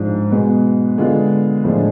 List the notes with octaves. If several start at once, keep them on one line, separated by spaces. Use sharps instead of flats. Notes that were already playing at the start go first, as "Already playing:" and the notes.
Already playing: G#2 F3 G#3 D4
B2 G#3 B3
D3 G#3 B3 F4
A2 F3 G#3 D4